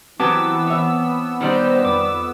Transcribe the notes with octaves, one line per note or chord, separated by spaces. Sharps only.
E3 F#3 B3 C4 G4 A5 D6 E6
C#5 E5
D#3 G3 D#4 G4 C5 D5
F2 D6